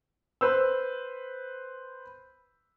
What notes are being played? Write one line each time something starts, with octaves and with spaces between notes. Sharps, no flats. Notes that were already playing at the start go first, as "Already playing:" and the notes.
B4 C5 E6